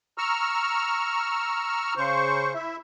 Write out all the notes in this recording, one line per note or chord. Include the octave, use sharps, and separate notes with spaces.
A#5 C#6 E6 F6
C#3 C5 C#6
E4 E5